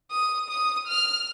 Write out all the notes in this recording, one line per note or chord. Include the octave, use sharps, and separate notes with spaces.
D#6
D#6
F6